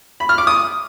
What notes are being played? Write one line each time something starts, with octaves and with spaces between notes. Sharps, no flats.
B5
F6
D6
D#6